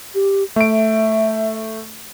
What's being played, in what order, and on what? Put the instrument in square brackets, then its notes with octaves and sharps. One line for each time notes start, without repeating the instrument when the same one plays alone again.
[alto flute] G4
[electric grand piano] A3 D7 [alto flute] E5